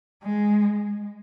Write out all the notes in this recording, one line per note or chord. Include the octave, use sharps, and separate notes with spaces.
G#3